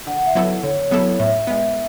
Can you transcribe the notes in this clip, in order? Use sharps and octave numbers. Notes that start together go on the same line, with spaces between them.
D3 F#5
E5
F#3 B3 E4 A4
D3 C#5
F#3 B3 E4 A4
A2 E5
G#3 B3